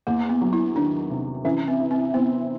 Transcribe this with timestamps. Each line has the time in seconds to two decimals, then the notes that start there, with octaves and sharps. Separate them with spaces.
0.07 E2 A#3
0.29 B3
0.41 F#3
0.53 E4
0.76 D#3 D4
1.10 C3
1.45 E3 C#4
1.68 C4
1.80 E4
1.91 C4
2.14 B3 C4